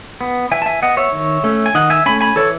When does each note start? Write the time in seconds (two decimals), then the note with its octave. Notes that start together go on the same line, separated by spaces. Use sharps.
0.21 B3
0.51 E3 E5 G#5
0.62 A5
0.66 E5 G#5
0.82 B3 D#5 F#5
0.97 C#5 E5
1.12 D#3
1.44 A3 C#4
1.66 G#5
1.75 D#3 D#5 F#5
1.90 E5 G#5
2.06 A3 C#4 G#5 B5
2.21 G#5 B5
2.36 E3 A4 C#5